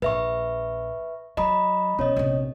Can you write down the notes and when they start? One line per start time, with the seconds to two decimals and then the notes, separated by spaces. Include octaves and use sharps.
0.02 A#1 B4 E5 C#6
1.37 F#3 D#5 A#5 B5
1.98 B2 C#4 C#5 D#5
2.16 A#1 C3